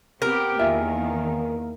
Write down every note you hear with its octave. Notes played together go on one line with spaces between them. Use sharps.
B3 C4 G4 A#4
E2 D#3 A#3 F4 E5 G#5